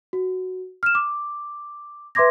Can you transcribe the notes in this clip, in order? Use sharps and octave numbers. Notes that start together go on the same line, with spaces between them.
F#4
F6 E7
D6
B4 E5 C6 D6 G#6 A#6